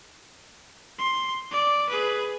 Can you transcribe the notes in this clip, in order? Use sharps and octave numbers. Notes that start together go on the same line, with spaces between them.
C6
D5
G#4 B4